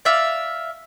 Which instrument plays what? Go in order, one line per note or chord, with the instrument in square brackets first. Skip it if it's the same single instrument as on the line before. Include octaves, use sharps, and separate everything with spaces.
[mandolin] D5 E5 F5